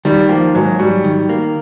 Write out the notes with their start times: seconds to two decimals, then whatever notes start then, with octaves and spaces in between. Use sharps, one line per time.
0.05 D#3 G3
0.29 F3 A#3
0.55 G#2 F#3
0.79 F#3 G3
1.04 D#3
1.29 A#3